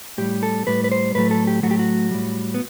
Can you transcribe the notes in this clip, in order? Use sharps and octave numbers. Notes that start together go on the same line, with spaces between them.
A2 G3 G4
A4
A2 G3 B4
B4
C5
A2 F#3 A3 B4
A4
G4
A2 F#3 A3 F#4
G4
F#4
A2 G3
B3